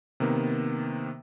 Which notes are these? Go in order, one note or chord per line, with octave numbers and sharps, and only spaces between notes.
C3 D#3 A#3 B3